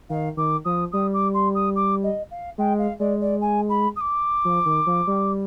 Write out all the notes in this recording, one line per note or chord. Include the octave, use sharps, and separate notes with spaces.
D#3 F5
D#3 D6
F3 D#6
G3 D#6
D6
C6
D#6
D6
D#5
F5
G#3 G5
F5
G#3 D5
D5
G#5
B5
D#6
D6
F3
D#3
F3
G3